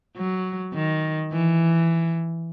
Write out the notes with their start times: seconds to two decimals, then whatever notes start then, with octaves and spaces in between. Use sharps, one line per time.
0.17 F#3
0.74 D#3
1.32 E3